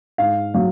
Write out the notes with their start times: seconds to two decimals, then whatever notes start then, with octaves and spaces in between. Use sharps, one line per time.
0.18 G#2 F5
0.54 F#3 F5